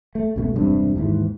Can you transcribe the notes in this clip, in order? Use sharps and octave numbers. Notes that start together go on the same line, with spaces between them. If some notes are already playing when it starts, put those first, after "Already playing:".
A3
C#2 B2 A3
E1 G2 C3
D#2 G#2 E3